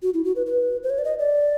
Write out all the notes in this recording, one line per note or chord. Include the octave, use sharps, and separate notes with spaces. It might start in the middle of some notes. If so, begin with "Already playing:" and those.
F#4
E4
F#4
B4
B4
C5
C#5
D5
D#5
D5